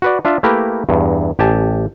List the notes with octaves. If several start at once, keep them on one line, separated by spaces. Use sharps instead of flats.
F#4 B4 D5
D4 F4 E5
A3 A#3 E4 G4 A#4 B4
E2 G2
A1 G4 G#5 A5